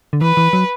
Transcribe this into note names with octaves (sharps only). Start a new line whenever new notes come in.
D3
E3 B4
E3
F#3